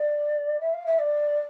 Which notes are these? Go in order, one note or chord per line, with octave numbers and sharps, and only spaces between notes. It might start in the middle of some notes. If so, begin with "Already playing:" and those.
Already playing: D5
E5
F5
E5
D5